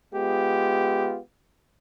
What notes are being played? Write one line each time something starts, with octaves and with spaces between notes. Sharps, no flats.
G#3 B3 F4 G4